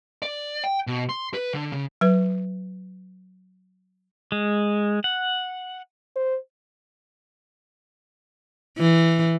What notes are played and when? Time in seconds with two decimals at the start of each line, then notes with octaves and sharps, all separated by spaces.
0.22 D5
0.64 G5
0.87 B2
1.09 C6
1.34 B4
1.54 D3
1.72 C#3
2.01 F#3 B4
4.32 G#3
5.04 F#5
6.16 C5
8.78 E3